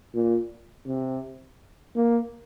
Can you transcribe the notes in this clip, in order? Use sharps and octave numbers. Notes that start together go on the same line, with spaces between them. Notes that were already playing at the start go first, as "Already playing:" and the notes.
A#2
C3
A#3